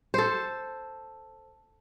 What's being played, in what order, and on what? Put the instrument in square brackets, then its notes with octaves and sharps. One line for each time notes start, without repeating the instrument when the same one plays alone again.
[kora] A4 C5